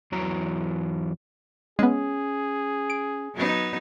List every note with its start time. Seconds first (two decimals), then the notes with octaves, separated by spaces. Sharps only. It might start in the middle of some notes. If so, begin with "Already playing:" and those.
0.12 E2 E3 F#3 A#5
1.79 G#3 B3 C#4 G#4
2.90 D7
3.34 F#3 B3 D#4